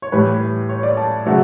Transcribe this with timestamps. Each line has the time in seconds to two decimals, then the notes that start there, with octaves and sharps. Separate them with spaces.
0.02 C#5
0.12 A2 E3 G3 B4
0.69 C#5
0.83 D5
0.97 A5
1.26 C#3 F#3 A3